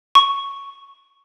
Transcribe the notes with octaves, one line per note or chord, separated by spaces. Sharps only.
C#6